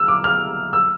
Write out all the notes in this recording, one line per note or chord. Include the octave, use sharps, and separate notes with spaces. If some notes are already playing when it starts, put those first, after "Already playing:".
Already playing: E6 F6
D6
F6
E6